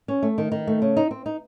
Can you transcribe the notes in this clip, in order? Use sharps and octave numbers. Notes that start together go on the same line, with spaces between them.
C#4
A3
D#3
D#3
A3
C#3
D#4
C4
D#4